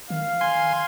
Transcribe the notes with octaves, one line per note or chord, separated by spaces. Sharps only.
D#3 F5
G#5 C6